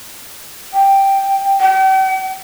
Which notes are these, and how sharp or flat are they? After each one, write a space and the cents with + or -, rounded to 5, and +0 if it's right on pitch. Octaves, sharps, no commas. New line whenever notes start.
G5 +0
G5 -45